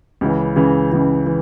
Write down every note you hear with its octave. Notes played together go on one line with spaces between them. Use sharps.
C#2 C#3 E3
C#2 C#3 E3
C#2 C#3 E3
E3